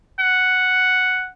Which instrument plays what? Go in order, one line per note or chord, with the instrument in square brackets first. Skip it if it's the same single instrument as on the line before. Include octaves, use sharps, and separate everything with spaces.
[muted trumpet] F#5